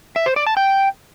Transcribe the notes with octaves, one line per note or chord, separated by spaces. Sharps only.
E5
C5
D5
A5
G5